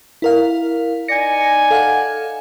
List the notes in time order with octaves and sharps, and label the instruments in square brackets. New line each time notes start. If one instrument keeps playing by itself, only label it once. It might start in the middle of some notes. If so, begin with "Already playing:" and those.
[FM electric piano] E4 A#4 F5
[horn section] D#4 D5 G#5 [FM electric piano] A#6 C#7
[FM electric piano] A4 F5 F#5